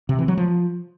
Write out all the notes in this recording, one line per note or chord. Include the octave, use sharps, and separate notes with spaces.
C3
E3
F#3
F3